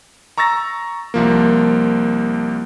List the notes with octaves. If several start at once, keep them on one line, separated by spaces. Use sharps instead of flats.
A#5 C#6 E6 A6 A#6
C2 F3 A#3